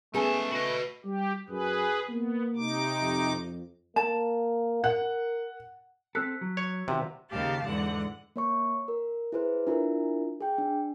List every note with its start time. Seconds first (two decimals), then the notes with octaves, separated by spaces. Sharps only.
0.14 A3 B3 C#4 D#4 G#4 G#5 A5
0.51 F#4 B4 D#5
1.05 G3 G4
1.49 F#2 G#4 B4
2.09 A#3 B3
2.56 C3 D#4 D6
3.01 F2
3.96 A#3 A5
4.84 A#4 F#5
6.15 C4 A4 E6 F#6 B6
6.41 F#3
6.57 C#5
6.88 C3 D#3 F#4 B4
7.29 D#2 C#3 G4 F5 A5
7.67 E2 G#2 D3 F#5
8.36 A#3 C#5 C#6
8.88 A#4
9.32 E4 G#4 B4 C5
9.67 D4 E4 F4 A#4
10.41 G#4 G5
10.58 D4